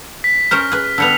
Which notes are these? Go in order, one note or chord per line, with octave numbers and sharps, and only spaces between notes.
B6
C#4 A#4 C5 F6
G#4 B4
D3 G3 B3 E6 C#7 F7